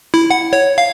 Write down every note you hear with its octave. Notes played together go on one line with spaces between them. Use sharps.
E4
F#5
C#5
F5